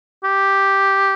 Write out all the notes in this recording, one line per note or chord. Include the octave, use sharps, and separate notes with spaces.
G4